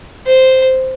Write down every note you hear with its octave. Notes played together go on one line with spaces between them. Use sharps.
C5